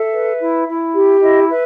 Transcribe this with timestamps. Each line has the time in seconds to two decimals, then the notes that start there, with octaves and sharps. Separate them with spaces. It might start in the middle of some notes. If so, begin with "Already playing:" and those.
Already playing: A4 E5
0.12 B4
0.40 E4
0.67 E4
0.94 G4
1.21 E4 D#5
1.49 B4 E5